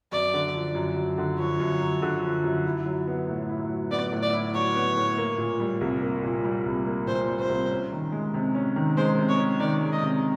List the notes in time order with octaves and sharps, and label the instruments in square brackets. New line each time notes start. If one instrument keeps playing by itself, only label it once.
[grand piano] F#2 [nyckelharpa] D5
[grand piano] D3
F3
F#2
F#2
D3
[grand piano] F3 [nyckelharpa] C#5
[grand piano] F#2
F#2
D3
F3
F#2
E4
F#3
B3
A2
E4
F#3
[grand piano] B3 [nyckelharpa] D5
[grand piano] A2
[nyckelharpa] D5
[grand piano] E4
[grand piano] F#3 [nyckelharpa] C#5
[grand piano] B3
A2
A#3
A#2
G3
C2
A#3
A#2
G3
C2
A#3
[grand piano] A#2 [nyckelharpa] C5
[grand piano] G3
[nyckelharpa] C5
[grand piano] C2
C#4
D#3
G#3
C3
C#4
D#3
[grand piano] G#3 [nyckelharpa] C5
[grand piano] C3
[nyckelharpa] C#5
[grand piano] C#4
[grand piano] D#3 [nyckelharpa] D5
[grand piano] G#3
[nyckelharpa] D#5
[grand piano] C3